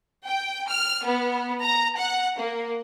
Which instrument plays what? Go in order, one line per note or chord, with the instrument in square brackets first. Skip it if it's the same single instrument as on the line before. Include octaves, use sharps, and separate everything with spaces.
[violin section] G5
F6
B3
A#5
F#5
A#3